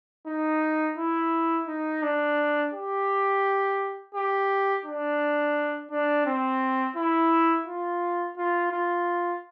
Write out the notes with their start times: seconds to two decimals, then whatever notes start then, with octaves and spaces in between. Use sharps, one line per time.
0.27 D#4
0.98 E4
1.67 D#4
2.03 D4
2.73 G4
4.14 G4
4.85 D4
5.91 D4
6.26 C4
6.96 E4
7.67 F4
8.37 F4
8.72 F4